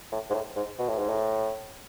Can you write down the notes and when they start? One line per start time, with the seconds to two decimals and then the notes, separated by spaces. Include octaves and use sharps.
0.12 A2
0.30 G#2
0.34 A2
0.56 G#2
0.79 B2
0.89 A2
0.98 G#2
1.09 A2